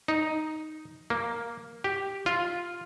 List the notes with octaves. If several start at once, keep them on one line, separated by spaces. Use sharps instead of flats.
D#4
A#3
G4
F4